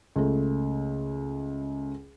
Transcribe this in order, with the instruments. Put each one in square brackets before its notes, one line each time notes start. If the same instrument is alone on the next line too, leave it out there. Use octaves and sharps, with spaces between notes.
[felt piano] C#2 A3